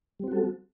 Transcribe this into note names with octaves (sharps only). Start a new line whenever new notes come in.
G3 C4 F#4 A4